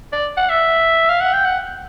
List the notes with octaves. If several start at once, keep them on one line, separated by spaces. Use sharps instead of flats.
D5
F#5
E5
F5
F#5
G5
F#5